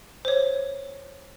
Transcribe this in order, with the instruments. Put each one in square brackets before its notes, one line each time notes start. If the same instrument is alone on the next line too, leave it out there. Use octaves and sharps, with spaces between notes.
[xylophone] C5 C#5